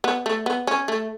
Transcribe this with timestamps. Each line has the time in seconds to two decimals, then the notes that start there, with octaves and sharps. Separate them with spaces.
0.04 B3
0.26 A3
0.46 B3
0.67 C#4
0.88 A3